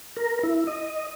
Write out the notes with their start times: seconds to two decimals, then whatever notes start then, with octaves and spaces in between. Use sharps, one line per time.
0.17 A#4
0.43 E4
0.67 D#5